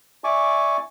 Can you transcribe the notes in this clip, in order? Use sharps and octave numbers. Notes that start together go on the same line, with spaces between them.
D5 E5 G#5 C#6 D6